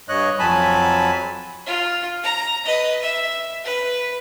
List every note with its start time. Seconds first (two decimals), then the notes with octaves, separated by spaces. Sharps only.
0.09 G2 C#5 D#5 F#6
0.39 F2 F#3 G#5 A5 B5
1.66 F4
2.24 A#5
2.65 B4 D#5
3.02 E5
3.64 B4